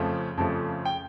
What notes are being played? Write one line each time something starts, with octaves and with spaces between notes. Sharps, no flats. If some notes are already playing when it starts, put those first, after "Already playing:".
Already playing: F2 C#3 F3 A3
F2 C#3 F3 A3 A5
G5